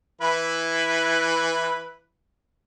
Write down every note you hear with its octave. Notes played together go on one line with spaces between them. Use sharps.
E3 E4 B4